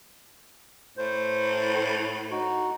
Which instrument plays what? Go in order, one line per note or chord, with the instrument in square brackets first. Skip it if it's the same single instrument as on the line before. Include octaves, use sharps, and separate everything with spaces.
[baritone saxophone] A2 [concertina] C5
[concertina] D#4 F#4